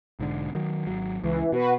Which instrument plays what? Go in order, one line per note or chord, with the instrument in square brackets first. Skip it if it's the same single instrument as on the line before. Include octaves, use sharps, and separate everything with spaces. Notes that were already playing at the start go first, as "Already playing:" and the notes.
[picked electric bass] B1 G#2 D3
D#3 F#3
G#1 F#3
[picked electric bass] C#2 [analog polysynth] E3
[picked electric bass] B2 [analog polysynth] F#4 B4